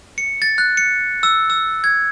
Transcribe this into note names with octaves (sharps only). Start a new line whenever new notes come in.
C#7
A6
F#6
C#7
E6
E6
G#6